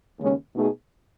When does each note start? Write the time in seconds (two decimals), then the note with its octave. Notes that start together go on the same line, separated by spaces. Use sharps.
0.19 D#2 C#3 G#3 C#4
0.55 B2 A3 D#4 G#4